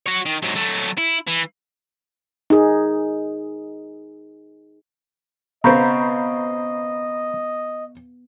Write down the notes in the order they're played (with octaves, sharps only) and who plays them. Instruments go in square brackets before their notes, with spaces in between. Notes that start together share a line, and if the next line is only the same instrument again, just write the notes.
[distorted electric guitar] F#4 C#5
D#3
G#2 F#3
F#3 A3
E4
E3
[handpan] D#4 G#4
[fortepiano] C#3 C4 [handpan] B3 [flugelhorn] D#5 [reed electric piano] A#5 B5 G6